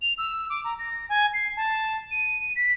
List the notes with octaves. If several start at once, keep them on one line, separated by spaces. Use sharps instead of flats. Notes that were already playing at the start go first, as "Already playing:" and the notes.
F7
E6
D6
A#5
A#6
G#5
C7
A5
D#7
B6